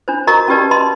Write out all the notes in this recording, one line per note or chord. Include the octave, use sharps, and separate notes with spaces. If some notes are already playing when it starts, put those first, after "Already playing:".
D4 F4 C5
F#4 A#4 D#5 A#5 C#6
C#4 F4 G4 B4 D5 A5
D#5 A5 B5 C6